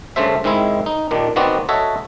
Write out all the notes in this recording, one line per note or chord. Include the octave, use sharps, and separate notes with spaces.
G2 C#3 A3 A4 C5 E5
G#2 D#3 G#3 C4 E4 G#5
D#4
D#2 A#2 D#3 D4
D#3 B3 C4 F#4 D5
F#4 A4 C#5 D#5 E5